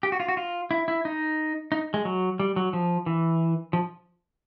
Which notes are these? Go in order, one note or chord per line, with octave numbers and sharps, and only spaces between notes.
G4
F#4
F4
F#4
F4
E4
E4
D#4
D#4
G#3
F#3
G3
F#3
F3
E3
F3